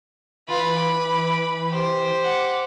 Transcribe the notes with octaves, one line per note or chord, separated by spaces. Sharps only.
E3 F4 B4 B5
D6
G4 C5
F#5 D6